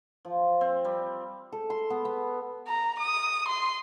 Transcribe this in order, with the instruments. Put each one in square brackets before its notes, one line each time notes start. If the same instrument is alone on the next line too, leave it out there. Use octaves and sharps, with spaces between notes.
[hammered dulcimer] F3
C4
G3
A4
C6
B3
B3
[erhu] A#5
D#6
C6